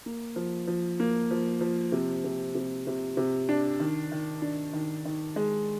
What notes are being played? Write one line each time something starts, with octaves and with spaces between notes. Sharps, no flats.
A#3
F3
F3
A#3
F3
F3
C3
C3
C3
C3
C3
D4
D#3
D#3
D4
D#3
D#3
G#3